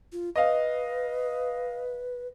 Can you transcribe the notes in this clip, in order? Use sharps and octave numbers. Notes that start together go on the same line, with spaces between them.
F4
B4 D#5 F5